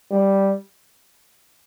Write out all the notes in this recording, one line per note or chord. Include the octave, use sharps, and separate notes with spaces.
G3